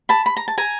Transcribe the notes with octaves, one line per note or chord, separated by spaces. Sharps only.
A5 B5
B5
A#5
A5
G#5 A#5